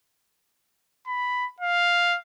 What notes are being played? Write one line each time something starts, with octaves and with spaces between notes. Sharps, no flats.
B5
F5